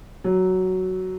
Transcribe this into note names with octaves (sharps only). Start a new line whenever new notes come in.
F#3